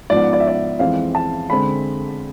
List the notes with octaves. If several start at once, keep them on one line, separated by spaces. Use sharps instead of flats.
G#2 F3 B3 D5
D5
E5
D5
F2 E3 G#3 C4 F5
A5
D3 G#3 C4 B5